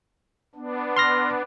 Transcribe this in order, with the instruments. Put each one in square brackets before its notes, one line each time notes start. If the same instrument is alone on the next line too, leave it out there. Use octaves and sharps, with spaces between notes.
[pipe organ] B3 D4
[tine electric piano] C6 F6 A#6